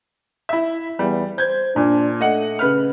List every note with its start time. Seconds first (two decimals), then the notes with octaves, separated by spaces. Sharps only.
0.49 E4 E5
0.99 E2 G3
1.38 C5 G6 G#6
1.76 A#2 D4
2.21 A3 D#5 F#5
2.59 C#3 B4 F6